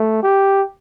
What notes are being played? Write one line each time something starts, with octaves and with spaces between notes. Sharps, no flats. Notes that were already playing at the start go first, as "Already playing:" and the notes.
Already playing: A3
G4